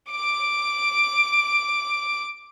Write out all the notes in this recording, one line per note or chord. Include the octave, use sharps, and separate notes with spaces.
D6 D7